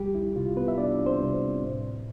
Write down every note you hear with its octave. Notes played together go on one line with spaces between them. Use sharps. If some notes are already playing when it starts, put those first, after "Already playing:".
Already playing: C2 G3 G4
E4
C3 G3 F4
B3 B4
E5
C2 D4 D5
C4 C5
C3 G3
A2